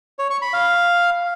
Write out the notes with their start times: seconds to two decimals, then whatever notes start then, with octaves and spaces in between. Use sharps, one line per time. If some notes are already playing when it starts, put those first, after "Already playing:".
0.19 C#5
0.30 C#6
0.42 B5
0.53 F5